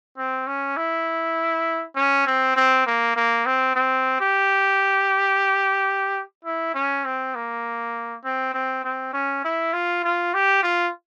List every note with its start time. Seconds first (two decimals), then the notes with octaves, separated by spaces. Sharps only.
0.18 C4
0.47 C#4
0.77 E4
1.96 C#4
2.27 C4
2.56 C4
2.87 A#3
3.16 A#3
3.46 C4
3.76 C4
4.20 G4
6.45 E4
6.74 C#4
7.05 C4
7.35 A#3
8.25 C4
8.54 C4
8.84 C4
9.13 C#4
9.44 E4
9.73 F4
10.04 F4
10.34 G4
10.63 F4